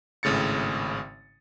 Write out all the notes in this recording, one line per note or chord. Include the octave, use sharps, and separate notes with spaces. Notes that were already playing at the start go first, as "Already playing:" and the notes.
G#1 A2 C#3 A6 C#7